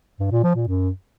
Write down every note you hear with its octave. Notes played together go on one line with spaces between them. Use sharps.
G2
A#2
F3
A#2
F#2